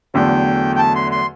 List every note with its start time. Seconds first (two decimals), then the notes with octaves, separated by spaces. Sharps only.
0.14 E2 D3 F#3 A3 G5
0.76 G5
0.78 A5
0.95 C6
1.12 C6